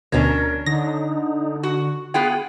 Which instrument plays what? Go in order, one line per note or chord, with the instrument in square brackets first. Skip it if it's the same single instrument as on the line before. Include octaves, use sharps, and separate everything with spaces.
[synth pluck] D2 B2 [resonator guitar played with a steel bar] C#4 D4 C#5 [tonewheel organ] A#4
[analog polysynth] D3 [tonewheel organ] D#4 [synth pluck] A#6
[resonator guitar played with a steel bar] F#4
[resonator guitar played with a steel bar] B3 F4 G5 [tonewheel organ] G#4 F#5